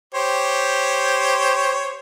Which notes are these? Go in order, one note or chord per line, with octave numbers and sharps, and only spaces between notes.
G4 C5 C#5